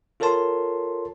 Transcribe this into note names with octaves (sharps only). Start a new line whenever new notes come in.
F4 A4 A#4 C#5 A5 C6